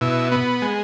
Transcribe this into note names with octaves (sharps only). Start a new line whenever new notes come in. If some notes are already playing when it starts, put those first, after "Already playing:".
B2 E4
B3
G#3